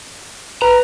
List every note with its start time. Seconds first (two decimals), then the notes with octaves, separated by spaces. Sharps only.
0.62 B4 A#5